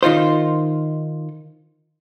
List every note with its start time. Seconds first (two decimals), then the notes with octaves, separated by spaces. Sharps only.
0.03 D#3 D#4 F4 C5